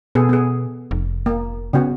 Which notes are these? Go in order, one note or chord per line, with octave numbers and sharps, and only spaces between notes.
B2 B3 G#4 A4
B3 G#4
F1
A#3
C#3 B3 F#4